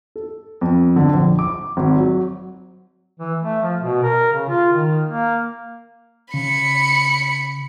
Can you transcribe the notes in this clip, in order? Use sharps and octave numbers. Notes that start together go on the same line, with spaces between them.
A4
F2
D3
A#1
D6
G#1
F#3
E3
A3
F3
B2
A#4
C#3
F4
D#3
A#3
C#3 B5 C#7